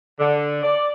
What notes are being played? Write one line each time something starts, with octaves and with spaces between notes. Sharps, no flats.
D3
D5